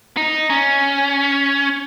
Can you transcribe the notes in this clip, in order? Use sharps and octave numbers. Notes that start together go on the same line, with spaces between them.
D#4
C#4